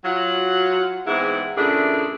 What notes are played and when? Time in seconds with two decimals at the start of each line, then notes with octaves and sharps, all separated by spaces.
0.05 F#3 F4 F#5
1.07 E2 G#2 C4 E4 F#5
1.56 A#2 C#3 A3 D4 E4 G#4